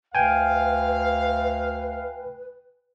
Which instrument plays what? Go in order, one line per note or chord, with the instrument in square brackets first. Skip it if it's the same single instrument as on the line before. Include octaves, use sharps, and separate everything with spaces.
[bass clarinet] D2 [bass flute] B4 [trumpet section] F5 [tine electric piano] G5 G#5